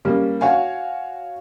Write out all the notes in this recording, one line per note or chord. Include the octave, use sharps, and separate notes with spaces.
G3 A#3 C#4
F#4 C#5 F5 G#5